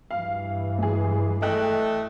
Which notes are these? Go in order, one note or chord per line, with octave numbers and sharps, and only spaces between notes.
G2 E3 F5
G#3 G#4
A3 D#5 G5 F#6